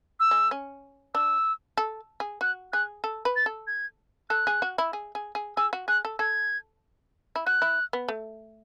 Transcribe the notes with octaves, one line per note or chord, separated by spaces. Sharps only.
E6
G#3
C#4
D4 E6
A4
G#4
F#4 F#6
G#4 F#6
A4
B4
A6
A4
G#6
A4 F#6
G#4
F#4
E4
G#4
G#4
G#4
G#4 E6
F#4
G#4 F#6
A4
A4 G#6
E4
F#4 F#6
E4
B3
A3